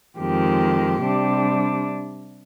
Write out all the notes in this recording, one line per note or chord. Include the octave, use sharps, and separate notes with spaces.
F2 D#3 G#3 G4
C3 G3 D4